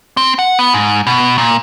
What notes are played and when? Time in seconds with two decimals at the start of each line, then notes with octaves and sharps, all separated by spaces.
0.17 C4
0.39 F#5
0.59 B3
0.74 G#2
1.07 B2
1.38 A#2